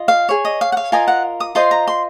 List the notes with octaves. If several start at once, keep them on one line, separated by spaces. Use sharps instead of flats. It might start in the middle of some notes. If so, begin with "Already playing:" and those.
Already playing: F4 D#5
F5
G#4 C#5
D#5
F5
F#5
F5
F4 A#4 D#5 G#5
F#5
D#6
F4 C5 D#5 C6
A#5
C6